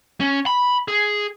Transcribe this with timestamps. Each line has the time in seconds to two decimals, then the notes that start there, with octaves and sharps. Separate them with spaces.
0.20 C#4
0.46 B5
0.88 G#4